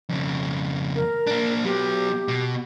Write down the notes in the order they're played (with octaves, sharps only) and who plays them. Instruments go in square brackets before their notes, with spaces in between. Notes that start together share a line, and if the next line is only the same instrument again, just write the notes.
[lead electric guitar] F2 C#3
[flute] A#4
[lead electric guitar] A#3 D4
[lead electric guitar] F#3 B3 [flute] G4
[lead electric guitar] B2